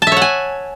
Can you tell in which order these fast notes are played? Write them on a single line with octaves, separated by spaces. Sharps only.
A5 E5 C#5 F#5 G#5